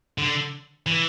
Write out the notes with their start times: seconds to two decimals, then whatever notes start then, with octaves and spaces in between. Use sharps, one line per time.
0.18 D3
0.86 E3